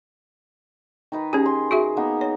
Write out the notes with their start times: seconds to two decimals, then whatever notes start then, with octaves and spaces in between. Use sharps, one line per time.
1.12 D#3 D#4 B4
1.33 C#4 G4 G#4
1.46 C6
1.71 F#4 G#4 E5
1.96 A#3 B3 D#4
2.21 C#5